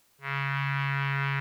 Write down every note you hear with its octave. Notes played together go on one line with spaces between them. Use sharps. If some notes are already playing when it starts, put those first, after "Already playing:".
C#3